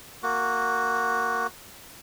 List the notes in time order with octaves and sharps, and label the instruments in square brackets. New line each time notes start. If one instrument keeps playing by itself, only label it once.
[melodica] A#3 F#4